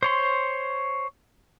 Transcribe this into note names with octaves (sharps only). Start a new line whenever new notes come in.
C5 C#5 C6